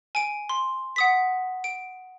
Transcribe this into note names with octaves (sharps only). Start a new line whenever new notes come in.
G#5 D7
C6
F#5 D#6 B6
D7